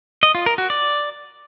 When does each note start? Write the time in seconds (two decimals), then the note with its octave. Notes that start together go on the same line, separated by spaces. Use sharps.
0.23 D#5
0.35 F4
0.46 A#4
0.58 F#4
0.70 D5